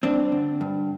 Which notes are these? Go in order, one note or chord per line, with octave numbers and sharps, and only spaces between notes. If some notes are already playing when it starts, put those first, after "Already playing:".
G2 C4 D4
D3
G2